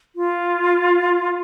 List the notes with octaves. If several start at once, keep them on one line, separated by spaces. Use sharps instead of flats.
F4